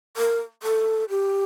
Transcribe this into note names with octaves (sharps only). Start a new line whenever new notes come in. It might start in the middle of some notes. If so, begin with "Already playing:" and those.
A#4
A4
G4